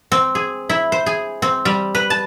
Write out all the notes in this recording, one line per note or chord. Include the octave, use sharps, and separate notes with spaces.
C4
G#4
E4
C5
G#4
C4
G3
B4
A5